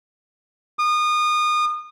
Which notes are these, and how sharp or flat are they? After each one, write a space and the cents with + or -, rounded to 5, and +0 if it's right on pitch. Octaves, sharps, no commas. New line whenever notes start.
D#6 -30